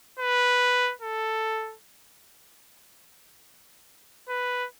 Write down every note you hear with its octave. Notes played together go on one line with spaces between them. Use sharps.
B4
A4
B4